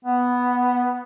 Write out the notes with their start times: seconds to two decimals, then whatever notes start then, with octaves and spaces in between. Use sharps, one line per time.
0.05 B3